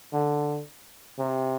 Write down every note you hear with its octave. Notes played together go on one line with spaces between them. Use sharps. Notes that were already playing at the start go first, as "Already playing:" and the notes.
D3
C3